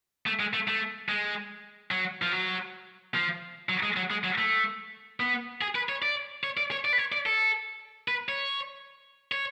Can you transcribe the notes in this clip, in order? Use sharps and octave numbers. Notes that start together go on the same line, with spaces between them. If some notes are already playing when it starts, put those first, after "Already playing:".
A3
G#3
A3
A3
G#3
F#3
F3
F#3
F3
F#3
G#3
F#3
G#3
F#3
A3
B3
G#4
B4
C#5
D5
C#5
D5
C#5
D5
B4
C#5
D5
A4
B4
C#5
C#5